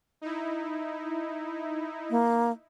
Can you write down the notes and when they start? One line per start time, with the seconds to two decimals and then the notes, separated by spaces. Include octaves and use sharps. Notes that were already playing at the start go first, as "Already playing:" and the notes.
0.21 D#4 E4
2.10 A#3